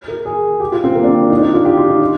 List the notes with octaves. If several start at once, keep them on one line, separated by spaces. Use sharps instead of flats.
A#4
G#4
G4
F4
C4
A#3
D4
C4
D#4
D4
D#4
F4
G4
F4
D#4
D4